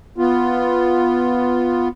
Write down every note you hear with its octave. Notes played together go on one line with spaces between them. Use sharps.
B3 F4